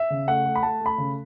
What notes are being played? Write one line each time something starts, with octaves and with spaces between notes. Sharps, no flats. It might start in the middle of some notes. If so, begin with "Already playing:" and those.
Already playing: E5
C#3
A3 F#5
A3
B5
A3 A5
A3
B5
C#3